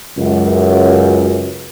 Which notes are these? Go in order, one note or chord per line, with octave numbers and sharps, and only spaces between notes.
C#2 F#2